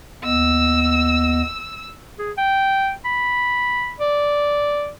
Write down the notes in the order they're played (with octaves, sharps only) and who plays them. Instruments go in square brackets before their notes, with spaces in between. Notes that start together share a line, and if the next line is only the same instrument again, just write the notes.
[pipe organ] D#2 B3 D#5 [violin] E6
[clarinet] G#4
G5
B5
D5